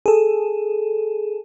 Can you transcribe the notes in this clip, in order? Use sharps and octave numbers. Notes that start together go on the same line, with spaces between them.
G#4 A4